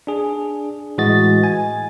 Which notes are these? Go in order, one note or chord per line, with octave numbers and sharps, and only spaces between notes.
D4 G#4
A2 E3 G#3 F#4 D#5 A6
G#5